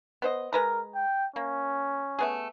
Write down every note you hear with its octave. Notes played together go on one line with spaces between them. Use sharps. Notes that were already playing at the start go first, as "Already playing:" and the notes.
B3 C5 D#5
G#3 A#4 B4 A#5
G5
A#3 C#4
A3 B3 G#4